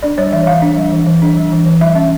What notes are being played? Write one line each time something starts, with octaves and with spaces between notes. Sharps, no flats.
D4 D5
G3 C#5
E3 E5
E3 F5
D4
G3
E3
E3
D4
G3
E3
E3
G3 E5
C#4